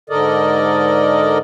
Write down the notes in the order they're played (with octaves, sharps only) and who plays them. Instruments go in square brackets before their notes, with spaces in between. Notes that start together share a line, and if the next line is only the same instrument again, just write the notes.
[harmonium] G#2 D3 A4 A#4 D5 D#5